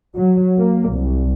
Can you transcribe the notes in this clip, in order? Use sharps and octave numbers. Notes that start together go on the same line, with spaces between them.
F#3
A#3
C2